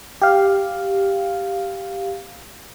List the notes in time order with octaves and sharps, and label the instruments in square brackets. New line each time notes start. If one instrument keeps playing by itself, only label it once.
[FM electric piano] G4 F5